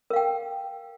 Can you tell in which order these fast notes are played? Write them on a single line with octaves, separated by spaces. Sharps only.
A#4 F5 G5